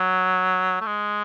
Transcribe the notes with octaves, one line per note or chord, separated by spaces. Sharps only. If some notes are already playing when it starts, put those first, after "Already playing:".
Already playing: F#3
A3
G#3